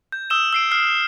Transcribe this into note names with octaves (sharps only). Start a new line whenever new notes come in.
G6
D#6 E6 E7
E6 C7 D7
F6 C7